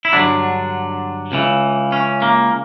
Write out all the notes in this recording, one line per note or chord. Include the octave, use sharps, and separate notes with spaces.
E4
G2 D3 F#3 D4
C#2 C#3 E3
C#4
A#3